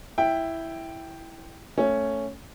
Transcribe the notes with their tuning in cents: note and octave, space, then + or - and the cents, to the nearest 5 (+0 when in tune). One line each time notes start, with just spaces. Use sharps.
E4 +0 G5 +0
A3 +15 C#4 +0